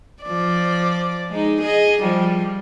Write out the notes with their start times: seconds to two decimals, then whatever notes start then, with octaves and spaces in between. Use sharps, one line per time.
0.23 F3 D5
1.30 G#3 D#4
1.61 G#4 D#5
2.01 F3 G3